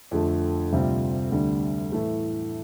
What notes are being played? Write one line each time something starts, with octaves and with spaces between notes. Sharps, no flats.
F2 D3 F3 A3
D2 C3 G3 C4 F4
D2 D3 G3
A2 E3 A3